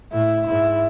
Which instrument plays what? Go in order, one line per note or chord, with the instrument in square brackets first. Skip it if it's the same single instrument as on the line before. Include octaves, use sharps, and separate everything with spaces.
[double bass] A2 [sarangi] E4
[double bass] G#2 [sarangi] E4